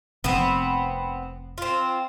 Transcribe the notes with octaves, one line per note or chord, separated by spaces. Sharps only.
F1 C3 B3 C4
C4 F4